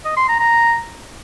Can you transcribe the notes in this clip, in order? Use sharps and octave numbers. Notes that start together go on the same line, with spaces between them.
D#5
C6
A#5
A#5